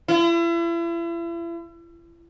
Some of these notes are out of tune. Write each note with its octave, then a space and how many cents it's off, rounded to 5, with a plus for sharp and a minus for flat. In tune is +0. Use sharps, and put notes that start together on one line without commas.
E4 +40